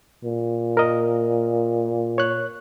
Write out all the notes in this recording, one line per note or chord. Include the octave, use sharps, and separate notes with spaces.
A#2
A#4 D#5
C#5 F#6